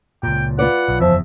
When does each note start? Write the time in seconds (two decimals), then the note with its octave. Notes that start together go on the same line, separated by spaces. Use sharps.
0.23 C#2 A#2 G5
0.59 F4 B4 D5 F#5
0.88 B1
1.00 F#1 E2 F3 E5